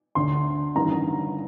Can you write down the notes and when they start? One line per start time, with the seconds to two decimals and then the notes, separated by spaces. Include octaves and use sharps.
0.15 D2 D3 C6
0.75 A1 G2 D#3 A#5